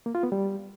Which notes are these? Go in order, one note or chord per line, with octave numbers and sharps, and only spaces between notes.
A#3
F4
B3
G3